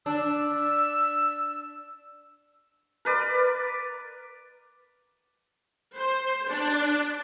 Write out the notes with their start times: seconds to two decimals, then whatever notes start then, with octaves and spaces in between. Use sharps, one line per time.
0.06 D4 E6
3.05 A#4 B4 D5
5.96 C5
6.50 D4